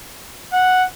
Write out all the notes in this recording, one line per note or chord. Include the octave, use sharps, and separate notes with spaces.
F#5